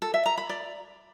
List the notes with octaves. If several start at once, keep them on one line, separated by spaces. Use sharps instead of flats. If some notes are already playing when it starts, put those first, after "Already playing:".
A4
E5
A#5
B5
D5